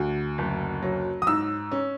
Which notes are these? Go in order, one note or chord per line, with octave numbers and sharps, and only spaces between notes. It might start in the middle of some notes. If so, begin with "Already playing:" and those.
Already playing: D2
F#1
F#3
D#6
G#2 E6
C#4